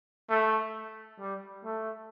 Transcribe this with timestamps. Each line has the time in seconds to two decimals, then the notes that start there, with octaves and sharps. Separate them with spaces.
0.30 A3
1.20 G3
1.65 A3